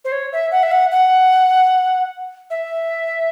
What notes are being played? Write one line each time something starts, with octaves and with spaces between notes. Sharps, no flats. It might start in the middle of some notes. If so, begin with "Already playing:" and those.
C5
C#5
E5
F#5
E5
F#5
F#5
E5